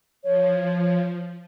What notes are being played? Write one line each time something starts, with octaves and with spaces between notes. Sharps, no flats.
F3 C#5